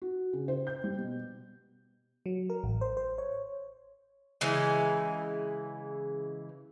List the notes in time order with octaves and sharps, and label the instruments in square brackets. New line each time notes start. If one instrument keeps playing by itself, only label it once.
[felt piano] F#4
C#3
C5
G6
G3
B2
[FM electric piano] F#3
A#4
A1
C5
C5
C#5
[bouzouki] C#3 E3 G#3